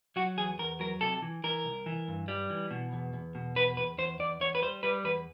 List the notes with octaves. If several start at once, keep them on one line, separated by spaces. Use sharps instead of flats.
F#3 F#4
E2 G#4
E2 A#4
F#3 A#4
C3 A4
E3
E3 A#4
C2
E3
G2
G3
E3
B2
E2
E2
B2
E2 B4
E2 B4
E2 C5
E2 D5
E2 C#5
B4
G3 C5
G3 B4
E2 B4